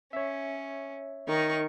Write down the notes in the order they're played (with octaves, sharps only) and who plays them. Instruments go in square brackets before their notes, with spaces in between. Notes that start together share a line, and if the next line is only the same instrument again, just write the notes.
[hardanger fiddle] C#4 [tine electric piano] C#5 E5
[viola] D#3 [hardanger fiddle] D#4 C#6